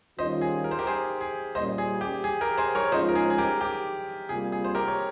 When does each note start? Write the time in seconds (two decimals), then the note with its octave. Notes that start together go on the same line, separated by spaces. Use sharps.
0.18 D#3 G3 C#4 F4 C5 D#5
0.41 G#4
0.64 A#4
0.71 C5
0.79 G4 A#4
0.87 G#4 C5
1.21 G#4
1.55 A#2 G3 C#4 C5 D#5
1.78 G#4
2.01 G4
2.24 G#4
2.41 G4 A#4
2.58 G#4 C5
2.75 A#4 C#5
2.92 G#2 F3 G#3 C#4 F4 C5 D#5
3.09 A#4
3.15 G#4
3.30 G#4
3.38 G4 A#4
3.61 G4
4.29 C3 G3 A#3 F4 G#4
4.52 G#4
4.64 C5
4.75 G4 A#4
4.88 C#5